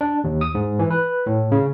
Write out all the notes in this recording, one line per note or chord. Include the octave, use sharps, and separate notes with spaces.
D4
D#2
D#6
G#2
E3
B4
A2
C#3